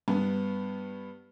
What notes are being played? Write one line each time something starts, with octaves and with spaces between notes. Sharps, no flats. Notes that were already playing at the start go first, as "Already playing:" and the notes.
G2 B3